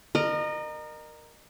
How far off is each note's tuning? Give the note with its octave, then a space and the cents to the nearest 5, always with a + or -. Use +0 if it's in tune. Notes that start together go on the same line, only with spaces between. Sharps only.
A#4 +0 D#5 -35